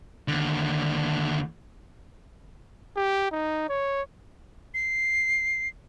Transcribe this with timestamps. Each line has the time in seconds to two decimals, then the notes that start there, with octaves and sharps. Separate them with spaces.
0.28 D#2 D3
2.96 G4
3.31 D#4
3.69 C#5
4.74 C7